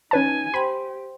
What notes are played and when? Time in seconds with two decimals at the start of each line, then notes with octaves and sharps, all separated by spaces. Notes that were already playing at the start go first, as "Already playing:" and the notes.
0.11 C#4 D#4 B4 G#5 A5
0.54 G4 C5 G5 B5 C6